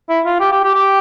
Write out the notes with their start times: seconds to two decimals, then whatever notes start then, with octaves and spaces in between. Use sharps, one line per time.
0.09 E4
0.25 F4
0.40 G4
0.52 G4
0.63 G4
0.75 G4